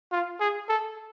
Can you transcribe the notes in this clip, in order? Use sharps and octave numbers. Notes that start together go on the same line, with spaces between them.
F4
G#4
A4